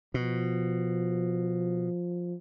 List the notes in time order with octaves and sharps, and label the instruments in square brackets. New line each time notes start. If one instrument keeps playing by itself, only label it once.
[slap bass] B2 [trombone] F3